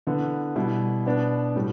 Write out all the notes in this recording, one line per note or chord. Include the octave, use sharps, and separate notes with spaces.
D3 B3 E4
B2 G3 E4
B2 B3 D4
A2 G3